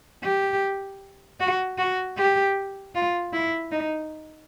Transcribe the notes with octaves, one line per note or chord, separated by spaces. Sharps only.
G4
F#4
F#4
G4
F4
E4
D#4